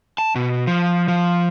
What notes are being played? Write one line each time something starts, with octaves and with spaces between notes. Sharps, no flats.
A5
B2
F3
F3